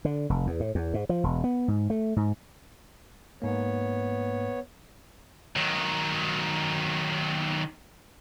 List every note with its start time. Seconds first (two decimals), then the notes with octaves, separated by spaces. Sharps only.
0.05 D3
0.30 F1
0.47 E2
0.60 A2
0.75 E2
0.94 G#2
1.09 F3
1.24 E1
1.44 B3
1.68 G#2
1.90 A3
2.16 G#2
3.42 G#2 A#3 B3 C#5
5.56 D#3 F#3